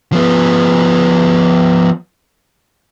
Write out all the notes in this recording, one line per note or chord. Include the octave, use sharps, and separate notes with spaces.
F3 B3